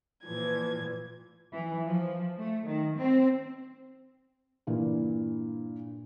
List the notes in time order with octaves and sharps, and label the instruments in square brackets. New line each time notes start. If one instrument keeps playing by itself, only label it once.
[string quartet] A#2 E3 F3 G#6
[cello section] E3
F3
A3
D#3
C4
[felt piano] G2 A#2 E3